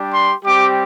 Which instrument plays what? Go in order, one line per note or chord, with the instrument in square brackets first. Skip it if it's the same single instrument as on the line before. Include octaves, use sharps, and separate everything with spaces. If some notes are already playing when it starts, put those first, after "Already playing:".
Already playing: [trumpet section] G3 D4 G4
C6
G3 C4 G4 D6